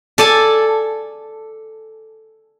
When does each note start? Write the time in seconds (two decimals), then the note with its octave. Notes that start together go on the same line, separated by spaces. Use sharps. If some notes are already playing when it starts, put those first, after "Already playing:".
0.18 A4 D5 G#5 A5